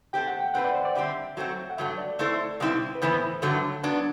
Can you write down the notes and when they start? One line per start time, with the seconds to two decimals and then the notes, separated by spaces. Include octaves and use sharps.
0.13 A3 C4 G4 G5
0.27 F#5
0.40 G5
0.54 A3 C4 G4 B4 F#5
0.64 D5
0.74 C5
0.85 D5
0.95 D3 G3 C4 G4 E5
1.37 F#3 A3 C4 F#4
1.70 F#5
1.77 G2 F#3 A3 E5
1.98 D5
2.19 A3 C4 E4 A4 C5
2.60 B2 G3 C4 E4
2.95 B4
3.01 A2 E3 B3 E4 C5
3.42 G2 D3 F#3 A3
3.83 F#3 B3 D4 A5